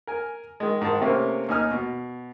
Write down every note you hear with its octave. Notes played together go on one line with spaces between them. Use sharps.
A#4 G#5
D#3 G#3
G#2 D#3 A5
C3 A3 A#3 C4 C#4
D#2 D#4 G#5 F6
B2